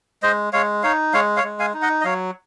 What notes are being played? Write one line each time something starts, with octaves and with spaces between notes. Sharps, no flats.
G#3 C5 D#5
G#3 C#5 F5
D#4 C#5 F5
G#3 C#5 F5
C#5 F5
G#3
F5 G#5
D#4
D#5 F#5
D#5
F#3 C#5 F5